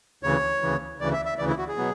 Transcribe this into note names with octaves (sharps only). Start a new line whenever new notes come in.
D2 C#3 E3 C#5
D2 C#3 E3
D2 C#3 E3 D5
E5
E5
D2 C#3 E3 D5
E4
F#4
G#4
B2 F#3 B3